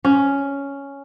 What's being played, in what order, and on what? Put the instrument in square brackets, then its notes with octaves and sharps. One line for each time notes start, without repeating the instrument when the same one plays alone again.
[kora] C#4